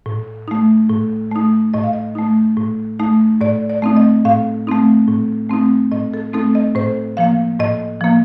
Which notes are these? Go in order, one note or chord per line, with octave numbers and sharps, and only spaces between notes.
A2
A3 D#4
A2
A3 D#4
A2 D#5
F5
D#5
A3 D#4
A2
A3 D#4
A2 D5
D5
A3 C4 D#4
D#5
A2 F5
A3 C4 D#4
A2
A3 C4 D#4
A2 D#5
A4
A3 C4 D#4 A4
D#5
A2 C5
F3 A#3 F5
A2 D#5
F3 A#3